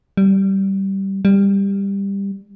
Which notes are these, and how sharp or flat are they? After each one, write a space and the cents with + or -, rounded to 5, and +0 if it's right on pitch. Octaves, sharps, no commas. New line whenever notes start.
G3 -15
G3 +15